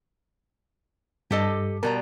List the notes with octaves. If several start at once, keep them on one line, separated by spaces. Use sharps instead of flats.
G2 G4 A4 D#5
B2 G3 A#4 A#5